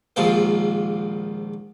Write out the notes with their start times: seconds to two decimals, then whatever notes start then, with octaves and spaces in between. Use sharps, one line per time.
0.16 A#1 D#2 G#2 F3 C5